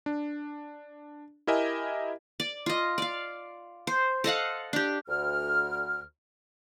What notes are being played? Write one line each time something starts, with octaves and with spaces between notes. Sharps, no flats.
D4
E4 G4 A#4 D#5 E5 G#5
D5
F4 D#5
D5 F5
C5
A4 D#5 F5 F#5
D4 G4
D2 F6